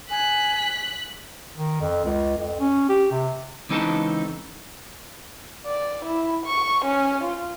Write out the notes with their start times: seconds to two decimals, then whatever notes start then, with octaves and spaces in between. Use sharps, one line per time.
0.11 G#5 F#6 B6
1.56 D#3
1.81 F2
2.05 C#2
2.37 F2
2.60 C#4
2.89 G4
3.11 C3
3.69 C#2 E3 C4 D#4 A4 A5
5.66 D5
6.05 E4
6.45 C#6
6.84 C#4
7.23 F4